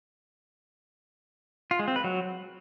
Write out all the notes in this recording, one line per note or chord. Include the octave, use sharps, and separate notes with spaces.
F4
G#3
C4
B4
F#3